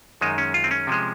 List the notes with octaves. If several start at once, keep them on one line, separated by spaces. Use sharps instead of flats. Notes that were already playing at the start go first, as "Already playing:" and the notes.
F#2 D#3 G#3 D#4
C#4
F4
C4
C#4
C3 F3 G#3